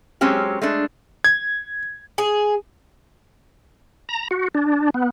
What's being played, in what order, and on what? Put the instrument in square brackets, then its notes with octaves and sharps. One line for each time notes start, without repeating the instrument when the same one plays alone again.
[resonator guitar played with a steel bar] F#3 G#3 C4 C#4 G4
G#3 A3 D4
[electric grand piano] G#6
[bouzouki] G#4
[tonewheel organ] A#5
F#4
D4
B3